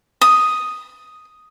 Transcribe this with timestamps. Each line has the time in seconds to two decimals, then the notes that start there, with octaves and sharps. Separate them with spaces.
0.21 D#6